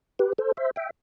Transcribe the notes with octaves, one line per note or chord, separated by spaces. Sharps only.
G4 B4
A4 C5
C5 E5
E5 G5